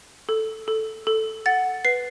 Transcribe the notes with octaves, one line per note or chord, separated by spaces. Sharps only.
A4
A4
A4
F#5 A6
B4 C7